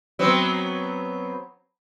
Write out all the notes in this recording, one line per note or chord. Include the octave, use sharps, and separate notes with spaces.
F#3 B3 C4